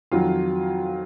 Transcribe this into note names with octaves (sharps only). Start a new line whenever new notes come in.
F2 D#3 F#3 F4